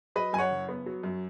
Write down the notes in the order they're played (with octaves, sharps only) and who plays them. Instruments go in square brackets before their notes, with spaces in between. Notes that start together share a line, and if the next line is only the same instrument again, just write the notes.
[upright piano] F#3 B4 D#5
F#2 G#5
C#5 F#5
F#1
B3
F#3
F#2